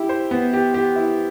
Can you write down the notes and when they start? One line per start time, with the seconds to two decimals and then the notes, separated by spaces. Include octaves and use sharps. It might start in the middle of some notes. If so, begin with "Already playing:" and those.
Already playing: E4 G4
0.09 C5
0.31 B3
0.53 G4
0.74 G4
0.96 E4